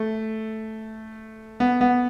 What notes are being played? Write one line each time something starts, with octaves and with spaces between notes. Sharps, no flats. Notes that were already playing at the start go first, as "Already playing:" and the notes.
Already playing: A3
B3
B3